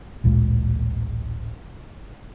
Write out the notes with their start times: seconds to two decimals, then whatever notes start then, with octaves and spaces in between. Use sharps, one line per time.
0.24 A1 D2 A#2 G#3